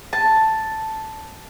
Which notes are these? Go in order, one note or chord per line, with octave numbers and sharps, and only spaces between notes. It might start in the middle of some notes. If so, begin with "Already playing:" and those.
A5